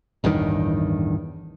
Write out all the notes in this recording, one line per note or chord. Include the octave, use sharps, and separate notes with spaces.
A1 E2 G2 D#3